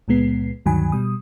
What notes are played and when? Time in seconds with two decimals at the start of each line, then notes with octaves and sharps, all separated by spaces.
0.08 C#2 A#2 G#3 B3 C7
0.66 D2 G2 D#3 F#3 G#5 B5
0.92 B2 G3 D#6